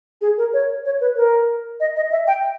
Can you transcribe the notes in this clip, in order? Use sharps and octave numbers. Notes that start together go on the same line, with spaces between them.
G#4
A#4
C#5
C#5
B4
A#4
D#5
D#5
E5
G5